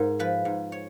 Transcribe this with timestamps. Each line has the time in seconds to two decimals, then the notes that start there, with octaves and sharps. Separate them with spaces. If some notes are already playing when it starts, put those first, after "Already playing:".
Already playing: G#2 A#4
0.19 F3 B4
0.45 G#2
0.72 C#5